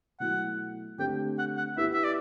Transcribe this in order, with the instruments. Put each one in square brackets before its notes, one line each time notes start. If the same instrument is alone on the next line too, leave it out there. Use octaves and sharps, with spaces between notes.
[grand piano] B2 F#3 A3 E4 [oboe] F#5
[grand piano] D3 A3 C4 G4 [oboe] G5
[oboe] F#5
F#5
[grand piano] B3 E4 G4 B4 [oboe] E5
[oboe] E5
D5